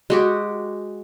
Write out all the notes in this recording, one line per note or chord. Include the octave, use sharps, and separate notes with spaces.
G#3 F#4 G4